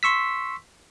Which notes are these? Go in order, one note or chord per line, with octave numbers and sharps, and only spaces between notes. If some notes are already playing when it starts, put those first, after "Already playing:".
C6 C#6 E6 B6